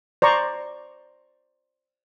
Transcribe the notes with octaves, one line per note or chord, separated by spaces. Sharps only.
C5 D5 A#5 C#6